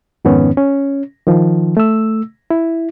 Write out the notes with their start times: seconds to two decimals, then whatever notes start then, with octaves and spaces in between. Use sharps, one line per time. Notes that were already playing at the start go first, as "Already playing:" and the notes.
0.25 F2 G#2 D#3 B3 C#4
0.57 C#4
1.27 D#3 F3
1.77 A3 E6
2.50 E4